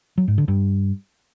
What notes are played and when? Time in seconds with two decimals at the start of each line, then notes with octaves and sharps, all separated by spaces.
0.18 F#3
0.28 G#2
0.38 D3
0.48 G2